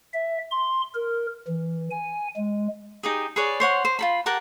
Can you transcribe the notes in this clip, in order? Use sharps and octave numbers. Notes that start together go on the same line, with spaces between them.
E5
C6
A#4
E3
G#5
G#3
D#4 G4 G#4
G#4 B4 C#5 D5
C5 C#5 F#5 C6
C5
F4 A4 B5
G4 A#4 F#5 A5